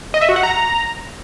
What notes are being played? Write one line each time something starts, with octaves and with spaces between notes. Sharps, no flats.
D#5
E5
F#4
F#5
A#5